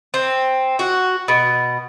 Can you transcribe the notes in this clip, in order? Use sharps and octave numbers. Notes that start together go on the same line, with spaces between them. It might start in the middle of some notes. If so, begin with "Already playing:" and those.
C4
F#4
B2